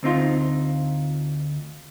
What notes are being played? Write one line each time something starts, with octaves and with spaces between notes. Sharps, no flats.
D2 C4 D#4 F4